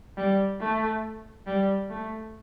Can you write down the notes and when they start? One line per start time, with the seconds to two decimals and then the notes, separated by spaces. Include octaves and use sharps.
0.17 G3
0.60 A3
1.46 G3
1.90 A3